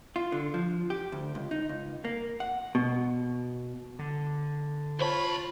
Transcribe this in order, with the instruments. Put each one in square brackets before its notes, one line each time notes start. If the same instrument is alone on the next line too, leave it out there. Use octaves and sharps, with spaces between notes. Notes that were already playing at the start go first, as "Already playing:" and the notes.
[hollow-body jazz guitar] F4
D3
F3
G4
D2
C#2
D#4
C#2
A#3
F#5
B2
[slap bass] D3
[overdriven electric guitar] C2 B5 [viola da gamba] F4 [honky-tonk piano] C5 C#5 A5